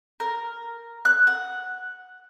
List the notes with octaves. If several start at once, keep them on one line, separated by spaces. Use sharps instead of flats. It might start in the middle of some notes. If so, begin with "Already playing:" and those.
A#4
F#6
F#5